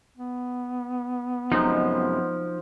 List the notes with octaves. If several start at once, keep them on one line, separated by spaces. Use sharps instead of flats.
B3
F#2 C3 F3 G#3 D#4